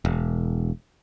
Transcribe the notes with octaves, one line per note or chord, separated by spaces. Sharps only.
E1